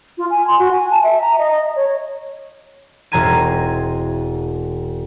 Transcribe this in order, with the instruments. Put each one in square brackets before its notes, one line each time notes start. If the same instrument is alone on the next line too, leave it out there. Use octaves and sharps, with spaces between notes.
[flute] F4
G#5
C6
F#4
G#5
A5
E5
A#5
D#5
D#5
C#5
[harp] E1 C4 A#5 G#6 D#7